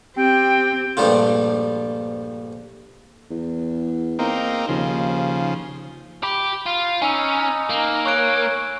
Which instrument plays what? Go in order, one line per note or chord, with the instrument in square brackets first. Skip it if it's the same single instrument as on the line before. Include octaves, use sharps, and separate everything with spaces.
[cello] C4 [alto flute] G4 [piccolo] G5
[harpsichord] A#1 G2 F3 G3 A3 F4
[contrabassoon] E2
[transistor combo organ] A#3 C4 D#4
[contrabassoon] D#2 [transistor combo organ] C#3 F3
[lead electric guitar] G4 [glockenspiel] B5
[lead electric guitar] F4
[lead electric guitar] C#4 [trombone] D#4 [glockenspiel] G#5 E6
[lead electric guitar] A#3
[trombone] C#5 [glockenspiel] C#6 F#6 D7